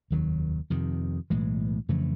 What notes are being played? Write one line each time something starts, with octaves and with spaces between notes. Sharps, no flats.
F1 D#2 D#3 F#3
F2 C3 D#3
B1 A2 E3 G#3
F2 C#3 E3 A3